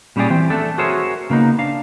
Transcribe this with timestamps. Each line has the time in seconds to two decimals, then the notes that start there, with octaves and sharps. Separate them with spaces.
0.16 A#2 G3 C#4 G4 G#4 D5
0.30 E3 C4 G4
0.50 A3 D4 A4
0.78 F#4 G#4 A#4 C5 C#5 E5
1.30 C#3 A#3 B3 D#4
1.59 D4 F5